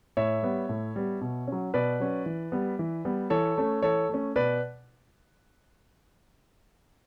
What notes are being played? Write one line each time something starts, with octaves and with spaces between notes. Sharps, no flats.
A2 C#5 E5
G3 B3
A2
G3 B3
B2
F#3 C#4
B2 B4 D5
F#3 C#4
E3
G3 B3
E3
G3 B3
E3 A4 C#5
A3 C#4
E3 A4 C#5
A3 C#4
B2 B4 D5